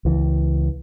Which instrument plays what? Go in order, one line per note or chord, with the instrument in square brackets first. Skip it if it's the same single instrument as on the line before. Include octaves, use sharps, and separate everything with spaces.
[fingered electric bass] C#2 E3